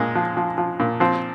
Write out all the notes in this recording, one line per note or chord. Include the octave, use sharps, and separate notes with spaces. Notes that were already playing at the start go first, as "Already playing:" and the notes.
Already playing: A#2 G#3
F3
F3
F3
A#2
F3 C4